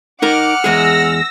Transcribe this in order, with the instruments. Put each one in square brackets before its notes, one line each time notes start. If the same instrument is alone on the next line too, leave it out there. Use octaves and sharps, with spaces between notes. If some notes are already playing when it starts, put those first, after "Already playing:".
[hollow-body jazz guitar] D#4 A#4 [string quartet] F#5 F6 [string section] D6
[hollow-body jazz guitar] E2 G#3 G#4 [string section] E6 A#6